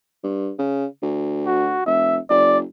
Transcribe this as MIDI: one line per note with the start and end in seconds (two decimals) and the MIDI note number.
0.24 0.51 43
0.59 0.86 49
1.02 1.77 38
1.46 1.82 66
1.86 2.19 29
1.86 2.20 76
2.30 2.63 30
2.30 2.58 74